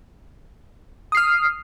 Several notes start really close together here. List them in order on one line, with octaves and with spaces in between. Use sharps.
D#6 C7 F6